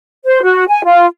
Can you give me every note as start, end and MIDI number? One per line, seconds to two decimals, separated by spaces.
0.25 0.43 72
0.44 0.65 66
0.68 0.83 80
0.85 1.06 65